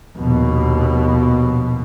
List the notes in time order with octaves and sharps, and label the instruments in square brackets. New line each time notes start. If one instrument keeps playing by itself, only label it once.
[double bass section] A#1 D#2 B2